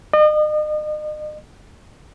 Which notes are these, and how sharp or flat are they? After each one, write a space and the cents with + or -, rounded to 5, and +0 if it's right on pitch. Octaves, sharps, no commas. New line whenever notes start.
D#5 -40